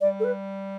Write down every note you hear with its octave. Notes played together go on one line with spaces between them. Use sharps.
G3 D5
A4
B4